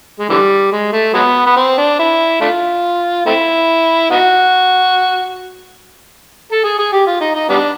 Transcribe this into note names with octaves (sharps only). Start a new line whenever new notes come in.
G#3
D3 E3 G3
G#3
A3
F#3 G#3 B3
B3
C4
D4
E4
A3 D4 F4
A3 C4 E4
B3 D#4 F#4
A4
G#4
G#4
G4
F4
D#4
D#4
G3 B3 D4